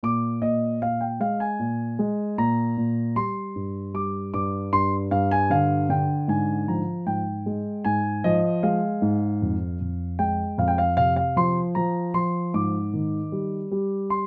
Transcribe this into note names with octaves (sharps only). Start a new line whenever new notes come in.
A#2 D6
A#2 D#5
A#2 F5
G5
G#3 F5
G#5
A#2
G#3
A#2 A#5
A#2
G3 C6
G2
G3 D6
G2 D6
G2 C6
G2 F5
G#5
D3 F5
D3 G5
G#2 G#5
F3 A#5
G#2 G5
G#3
G#2 G#5
F3 D#5
G#3 F5
G#2
F2
F2
G#3 G5
F2 F5
G5
F5
C3 F5
F5
F3 C6
F3 A#5
F3 C6
G#2 D6
D#3
G3
G3
C6